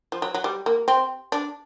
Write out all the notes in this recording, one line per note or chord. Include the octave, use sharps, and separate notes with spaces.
F3
F#3
F#3
G3
A#3
C4
D4